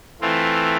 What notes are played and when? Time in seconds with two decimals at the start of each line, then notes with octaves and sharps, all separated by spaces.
0.21 E3 A3 C4 F4